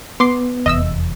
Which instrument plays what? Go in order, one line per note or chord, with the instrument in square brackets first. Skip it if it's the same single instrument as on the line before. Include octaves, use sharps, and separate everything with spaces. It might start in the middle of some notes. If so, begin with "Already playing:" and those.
[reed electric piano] B3 [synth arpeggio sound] C6 D6 C7
[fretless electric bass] F1 E2 [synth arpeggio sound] D#5 E5 E6